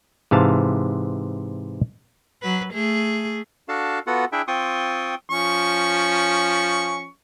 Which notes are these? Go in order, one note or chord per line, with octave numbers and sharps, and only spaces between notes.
G#2 C3 E3 F5 A5
F#3 B4
A3 G#4
D4 F#4 A4 F5 A5
B3 F4 F#4 A4 F#5
D4 E4 G#4 E5 G5
C4 F4 G5 C6 C#6 D#6
F3 C#4 C#6